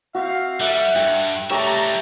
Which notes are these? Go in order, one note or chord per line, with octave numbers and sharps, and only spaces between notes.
C4 F#4 E5 F5
G3 F#4 A4 E5 F#5
G2 G5
G3 A3 G4 C#5 E5 A#5